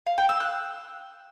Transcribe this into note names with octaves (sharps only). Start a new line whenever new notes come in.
F5
G5
E6
F#6